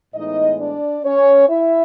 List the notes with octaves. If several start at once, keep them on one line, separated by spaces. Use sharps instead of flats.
A2 E3 G#3 B3 D#4 D#5
D4 D5
C#4 C#5
E4 E5